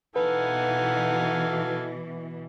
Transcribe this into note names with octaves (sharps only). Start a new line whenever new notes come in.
B2 E3 D#4 A4 B4 F5 F#5 G#5